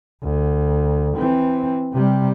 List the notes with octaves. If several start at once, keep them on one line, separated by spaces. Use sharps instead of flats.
D2
E3 C4
C3 G3